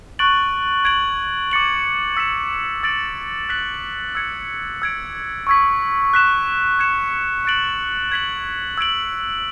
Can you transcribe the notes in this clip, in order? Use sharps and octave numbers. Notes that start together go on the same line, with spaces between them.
C#6 F#6 A6 D7 F#7
G#6 D7 F#7
D6 A6 C#7 F#7
E6 B6 E7
E6 A6 D7 F#7
F#6 B6 F#7
E6 G#6 C#7
E6 G#6 D7
C#6 E6 G#6 B6
F#6 B6 E7
G#6 C#7 E7
F#6 A6 D7 F#7
G#6 B6 F#7
E6 G#6 D7 F#7